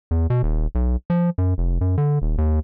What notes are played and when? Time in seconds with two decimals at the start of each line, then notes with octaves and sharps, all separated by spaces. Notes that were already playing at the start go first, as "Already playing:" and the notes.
0.11 E2
0.30 B2
0.43 D#1
0.75 B1
1.10 F3
1.38 F#2
1.58 F1
1.81 F#2
1.98 D3
2.22 D#1
2.38 D#2